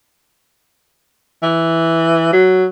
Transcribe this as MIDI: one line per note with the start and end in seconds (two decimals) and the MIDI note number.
1.43 2.32 52
2.33 2.66 54